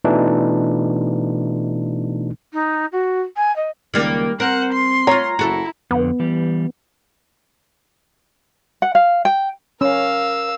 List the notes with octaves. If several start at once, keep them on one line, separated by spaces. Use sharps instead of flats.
B2 E3 A3 D4 D#4
D#4
F#4
G#5
D#5
C#2 D#3 G3 A#3
C4 A#4 C5 F#5
C6
F4 C#5 A#5
F#1 E4 F#4 A4
F2 D3 B3
E3 G3 G4
F#5
F5
G5
C#4 A#4 F5 E6